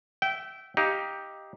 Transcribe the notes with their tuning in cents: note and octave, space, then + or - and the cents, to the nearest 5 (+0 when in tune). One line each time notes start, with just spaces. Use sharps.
E5 +0 G5 -25
D#4 +15 G4 +0 F5 +5